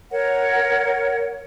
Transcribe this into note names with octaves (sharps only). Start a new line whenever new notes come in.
A#4 C#5 F#5